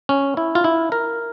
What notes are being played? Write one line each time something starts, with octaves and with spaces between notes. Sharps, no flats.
C#4
E4
F4
E4
A#4